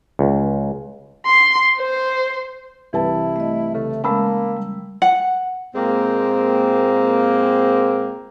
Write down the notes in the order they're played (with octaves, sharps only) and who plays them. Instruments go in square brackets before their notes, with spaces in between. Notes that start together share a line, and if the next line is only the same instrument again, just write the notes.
[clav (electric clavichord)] C#2
[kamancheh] C6
C5
[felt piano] C2 B4 A5 [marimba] E3 [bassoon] E4
[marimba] A3 D#5
[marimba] C#3 [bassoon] A3
[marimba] G#3 C#4 [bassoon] A#3 [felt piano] A5 B5 E6
[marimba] G3
[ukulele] F#5
[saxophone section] A#2 G#3 A#3 C4